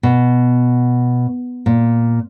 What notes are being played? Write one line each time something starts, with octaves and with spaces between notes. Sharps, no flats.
B2
A#2